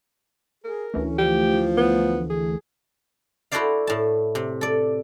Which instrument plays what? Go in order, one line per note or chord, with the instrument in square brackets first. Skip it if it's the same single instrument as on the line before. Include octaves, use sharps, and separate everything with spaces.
[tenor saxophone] G#4 [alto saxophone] A#4
[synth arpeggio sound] D2 E3 A3 [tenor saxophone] C#4
[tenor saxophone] F3 [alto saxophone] G4
[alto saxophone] B3
G#4
[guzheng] E4 F#4 A4 C5 D5 F5
A2 A5
C3
A4 D5